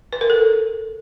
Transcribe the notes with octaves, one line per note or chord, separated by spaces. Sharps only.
B4
A#4
A4